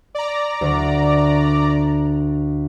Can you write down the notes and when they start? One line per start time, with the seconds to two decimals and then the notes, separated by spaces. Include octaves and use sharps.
0.15 D5 A#5
0.61 D2